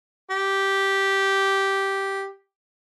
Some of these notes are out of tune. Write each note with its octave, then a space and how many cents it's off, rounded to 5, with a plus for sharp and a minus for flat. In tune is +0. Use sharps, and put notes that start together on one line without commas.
G4 -5